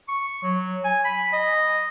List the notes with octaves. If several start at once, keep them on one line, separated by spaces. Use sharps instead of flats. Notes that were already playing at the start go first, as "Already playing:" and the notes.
C#6
F#3
G#5
B5
D#5